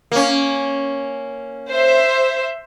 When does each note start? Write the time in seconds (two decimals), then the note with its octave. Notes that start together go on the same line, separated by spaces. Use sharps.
0.11 A#3 C#4
1.71 C5 E5